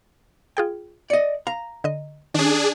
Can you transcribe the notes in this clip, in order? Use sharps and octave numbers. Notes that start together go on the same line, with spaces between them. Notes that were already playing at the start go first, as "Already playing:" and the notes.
F4 G#4 G5
D5 D#5 C#7
F5 A#5
D3 D#5
D#3 C#4 D4 G#4